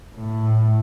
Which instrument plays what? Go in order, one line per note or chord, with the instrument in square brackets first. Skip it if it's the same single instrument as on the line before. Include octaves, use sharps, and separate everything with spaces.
[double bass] A2